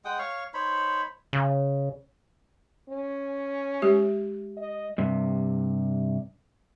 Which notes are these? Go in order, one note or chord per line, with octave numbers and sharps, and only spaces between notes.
G#3 F#5 G5 D#6
C#5 F5 C#6
D#4 C5 C#5 B5
C#3
C#4
G#3 G4 E5
D#5
G2 C3